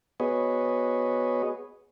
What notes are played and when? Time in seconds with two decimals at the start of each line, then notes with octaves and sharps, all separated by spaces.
0.20 B3 F#4 G#4 B4 C#5 D#5